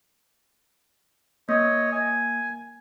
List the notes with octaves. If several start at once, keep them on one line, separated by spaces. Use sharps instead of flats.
A#3 C#5 D#5
G#5